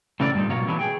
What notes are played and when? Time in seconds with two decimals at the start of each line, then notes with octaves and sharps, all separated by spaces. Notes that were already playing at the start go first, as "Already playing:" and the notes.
0.20 A2 C#3 E3 F#3 A4 D5
0.34 G2 A#2 D#4
0.49 B2 F#3 A#3 F4 C#5
0.67 D3 E3 F#3 B3 D4
0.79 G#4 G5